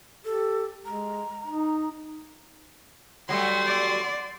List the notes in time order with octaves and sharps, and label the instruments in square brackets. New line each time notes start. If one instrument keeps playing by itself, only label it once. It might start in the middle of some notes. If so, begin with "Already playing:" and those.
[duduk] G4 [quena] A4
[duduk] G#3 [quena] A#5
[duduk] D#4
[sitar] F#3 G3 A3 [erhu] C6
[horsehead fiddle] D5